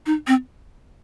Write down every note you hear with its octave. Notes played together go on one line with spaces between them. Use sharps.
D#4
C4